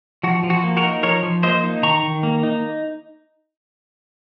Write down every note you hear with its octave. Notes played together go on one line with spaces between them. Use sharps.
F3 F#4
F3
F#4
A#3
F#4 A#4
D#4
F3 A#4 C#5
F3
A#3 C5 D#5
D#4
D#3 A#5 C#6
D#3
A#3
D#4